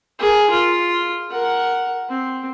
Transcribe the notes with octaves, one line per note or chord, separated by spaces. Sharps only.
G#4 A#4
F4
A#4 F#5
C4